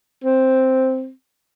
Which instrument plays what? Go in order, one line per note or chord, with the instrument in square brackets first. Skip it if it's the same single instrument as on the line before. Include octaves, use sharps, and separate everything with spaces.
[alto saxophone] C4